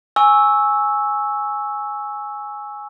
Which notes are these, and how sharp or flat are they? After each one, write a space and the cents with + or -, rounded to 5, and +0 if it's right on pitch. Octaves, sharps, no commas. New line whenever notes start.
G#5 +0 C#6 +0 E6 -10